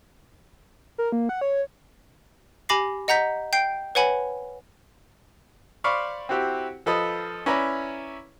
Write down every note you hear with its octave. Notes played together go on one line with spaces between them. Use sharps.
A#4
A#3
F#5
C#5
G4 G#5 B5 D6 A#6 C7
D#5 F#5 A#5 G6 B6
G5 G6 C7 D7
B4 C#5 F#5 G#5 B5
C5 D5 F5 B5 C#6
C4 E4 F#4 G4
F3 A4 B4 D#5
C#4 E4 B4 D5 A#5